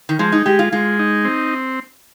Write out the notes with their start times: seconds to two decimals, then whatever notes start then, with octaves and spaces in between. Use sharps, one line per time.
0.09 D#3
0.19 F3 G#3
0.32 D#4
0.46 G#3 G4
0.59 F4
0.72 G#3 F4
0.99 D#4
1.25 C4